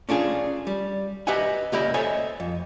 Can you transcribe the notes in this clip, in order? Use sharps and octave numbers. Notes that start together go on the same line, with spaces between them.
C#4 D4 F4 G#4
G3
G4 B4 D#5 E5 F#5 G#5
C#2 A#2 G4 D#5 E5 B5
A4 C5 C#5 D#5 E5 G#5
F2